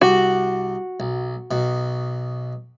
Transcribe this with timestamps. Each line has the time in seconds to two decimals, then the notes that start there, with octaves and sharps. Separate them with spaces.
0.02 C2 F#4 G4
1.00 B1
1.51 B1 B2